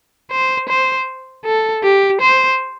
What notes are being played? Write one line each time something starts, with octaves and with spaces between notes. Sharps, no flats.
C5
C5
A4
G4
C5